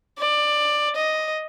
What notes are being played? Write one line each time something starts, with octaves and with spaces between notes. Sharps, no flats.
D5
D#5